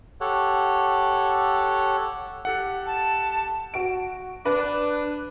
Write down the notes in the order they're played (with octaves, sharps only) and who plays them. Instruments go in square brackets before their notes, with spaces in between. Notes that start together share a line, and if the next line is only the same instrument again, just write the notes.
[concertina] G4 A4 C#5 F#5
[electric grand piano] G4 A4 F#5
[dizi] A5
[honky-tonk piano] F#4 D7
[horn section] D4 [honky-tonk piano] B4